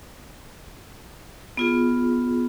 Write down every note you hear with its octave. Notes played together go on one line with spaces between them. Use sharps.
B3 F4 G#4